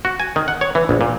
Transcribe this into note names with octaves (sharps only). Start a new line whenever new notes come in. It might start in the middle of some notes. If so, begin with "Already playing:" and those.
F#4
G#5
D#3
F#5
C#5
E3
A#1
A#2